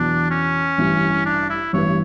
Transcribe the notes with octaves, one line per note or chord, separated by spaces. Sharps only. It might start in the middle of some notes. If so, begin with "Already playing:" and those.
Already playing: E2 B2 F#3 D4
C#4
A1 G2 E3
D4
E4
A1 G2 E3 B3 C#5